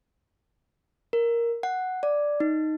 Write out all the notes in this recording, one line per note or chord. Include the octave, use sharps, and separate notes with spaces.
A#4
F#5
D5
D#4